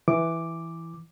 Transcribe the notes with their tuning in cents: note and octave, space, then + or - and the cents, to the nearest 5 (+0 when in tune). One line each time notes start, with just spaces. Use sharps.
E3 +0 D6 +0